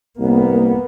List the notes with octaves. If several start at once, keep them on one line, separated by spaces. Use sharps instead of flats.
C2 A#3 B3